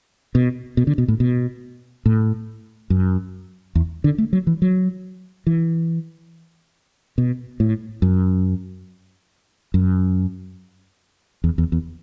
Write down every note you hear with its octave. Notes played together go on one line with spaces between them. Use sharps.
B2
B2
D3
B2
A2
B2
A2
F#2
E2
D3
A3
F#3
E3
F#3
E3
B2
A2
F#2
F#2
E2
E2
E2